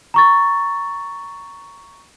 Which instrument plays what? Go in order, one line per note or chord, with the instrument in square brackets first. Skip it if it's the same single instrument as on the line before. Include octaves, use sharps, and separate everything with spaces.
[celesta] A#5 C#6 A6